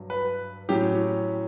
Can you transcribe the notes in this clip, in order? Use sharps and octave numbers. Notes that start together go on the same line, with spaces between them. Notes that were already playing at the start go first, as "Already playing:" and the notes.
Already playing: G2 F#3
B4
A2 F#3 C#4 G4